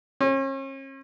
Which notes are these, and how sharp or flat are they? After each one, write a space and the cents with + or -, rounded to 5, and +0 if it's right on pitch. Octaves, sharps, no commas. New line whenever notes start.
C#4 -40